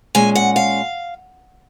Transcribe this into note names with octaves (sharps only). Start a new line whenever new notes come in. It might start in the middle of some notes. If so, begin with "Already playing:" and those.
A#2 G#3 C#4 G#5
F#5
F5